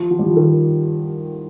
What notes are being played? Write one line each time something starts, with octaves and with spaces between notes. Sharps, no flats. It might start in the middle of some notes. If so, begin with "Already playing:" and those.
Already playing: F3
F3
G3
F3
D#3